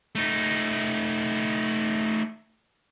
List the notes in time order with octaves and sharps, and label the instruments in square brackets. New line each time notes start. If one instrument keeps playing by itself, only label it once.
[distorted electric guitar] A3 D#4